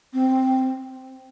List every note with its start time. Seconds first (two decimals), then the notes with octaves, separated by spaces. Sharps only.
0.14 C4